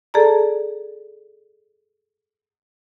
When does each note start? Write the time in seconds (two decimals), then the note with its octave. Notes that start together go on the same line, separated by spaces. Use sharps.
0.14 G#4 A4 D5 A5 A#5